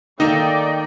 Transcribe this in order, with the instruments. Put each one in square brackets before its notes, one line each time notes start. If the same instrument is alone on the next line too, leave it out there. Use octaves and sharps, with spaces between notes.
[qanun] D#3 A3 A#3 [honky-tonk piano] D#4 [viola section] D5 G5